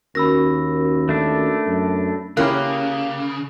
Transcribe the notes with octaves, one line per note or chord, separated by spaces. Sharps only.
D#2 C#4 F#4 A#4 B5 E6 A#6
A3 D4
F#2
C#3 A#3 C#4 E4 G4 F5 F#6